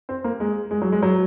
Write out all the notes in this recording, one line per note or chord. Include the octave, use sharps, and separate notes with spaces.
C4
A#3
G#3
G#3
F#3
G#3
F#3